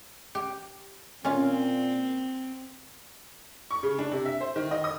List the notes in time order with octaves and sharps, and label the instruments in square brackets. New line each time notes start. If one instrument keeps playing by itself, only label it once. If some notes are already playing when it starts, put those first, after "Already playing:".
[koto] G4
[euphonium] A#2 [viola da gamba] C4 [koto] C#4 F4 F5
[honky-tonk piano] C#6
C#3
D4
C3
E5
C5
D#3
D#5
D#6